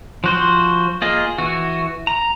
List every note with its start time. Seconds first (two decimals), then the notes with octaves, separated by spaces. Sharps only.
0.24 F3 F#4 C5
1.02 A#3 F4 G#4 D#5
1.38 E3 F#4
2.07 A#5